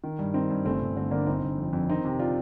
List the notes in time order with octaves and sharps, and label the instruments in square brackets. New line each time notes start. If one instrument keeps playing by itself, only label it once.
[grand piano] D#3
G2
D#3 C4 D#4
G2
G1 A3 C4
G1
D3 A3 C4
D3 A#3 D4
G1 C4 D#4
G1
F2
F2
D#3 C4 D#4
C3
D4 F4